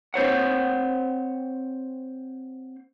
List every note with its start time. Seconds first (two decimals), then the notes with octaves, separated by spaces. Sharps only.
0.14 C4 C5 C#5 F#5